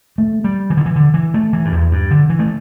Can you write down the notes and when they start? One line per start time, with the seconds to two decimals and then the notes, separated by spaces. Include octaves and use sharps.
0.18 A3
0.44 G3
0.70 E3
0.77 D3
0.86 E3
0.96 D3
1.14 E3
1.34 A3
1.53 E3
1.65 G2
1.72 E2
1.92 G2
2.11 D3
2.30 E3
2.39 A3